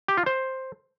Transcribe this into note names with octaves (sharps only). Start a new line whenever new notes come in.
G4
F4
C5